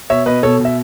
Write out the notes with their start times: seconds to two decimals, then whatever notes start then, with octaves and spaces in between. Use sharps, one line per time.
0.10 B2 C#5 E5
0.26 B2 B4 D#5
0.43 B2 A4 C#5
0.60 B2
0.65 E5